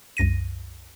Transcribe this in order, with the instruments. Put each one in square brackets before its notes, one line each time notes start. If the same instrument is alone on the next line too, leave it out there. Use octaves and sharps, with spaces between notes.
[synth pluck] C2 F#2 A#6 D#7